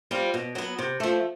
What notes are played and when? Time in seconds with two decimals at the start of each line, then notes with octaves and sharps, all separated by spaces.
0.11 G3 C4 F4
0.34 B2
0.55 F#3 B3
0.79 C3
1.00 F3 A3